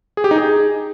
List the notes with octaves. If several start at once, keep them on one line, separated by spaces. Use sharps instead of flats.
G#4
G4
D#4
G#4